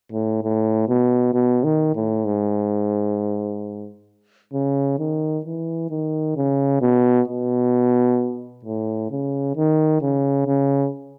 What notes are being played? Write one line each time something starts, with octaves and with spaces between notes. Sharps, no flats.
A2
A2
B2
B2
D#3
A2
G#2
C#3
D#3
E3
D#3
C#3
B2
B2
A2
C#3
D#3
C#3
C#3